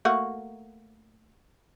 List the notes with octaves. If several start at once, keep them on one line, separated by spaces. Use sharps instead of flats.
A3 A#3 F#4